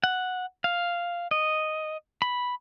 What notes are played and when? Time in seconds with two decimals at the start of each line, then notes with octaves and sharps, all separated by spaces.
0.04 F#5
0.64 F5
1.31 D#5
2.22 B5